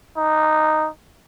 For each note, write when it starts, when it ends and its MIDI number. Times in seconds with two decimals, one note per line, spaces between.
0.17 0.88 63